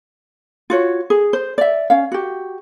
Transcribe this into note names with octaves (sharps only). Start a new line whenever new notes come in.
F4 F#4 C#5
G#4
C5
D5 E5
C#4 F5
F#4 G4